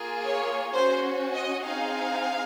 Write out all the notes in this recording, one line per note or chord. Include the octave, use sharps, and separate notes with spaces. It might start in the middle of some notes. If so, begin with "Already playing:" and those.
Already playing: A#3 F4 G#4
C#5
C#4 F#4 C5
D#5
C4 D#4 G#4 F5